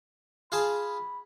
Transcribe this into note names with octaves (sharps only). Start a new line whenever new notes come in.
F4 G#4 A5 B5